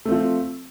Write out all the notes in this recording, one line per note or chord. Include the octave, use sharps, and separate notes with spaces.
F3 A3 C4